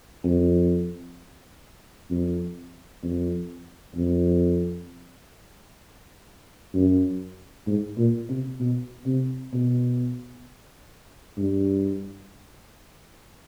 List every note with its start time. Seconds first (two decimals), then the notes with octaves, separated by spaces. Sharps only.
0.24 F2
2.10 F2
3.03 F2
3.96 F2
6.74 F#2
7.67 G#2
7.97 A#2
8.29 C3
8.60 B2
9.06 C3
9.53 B2
11.38 G2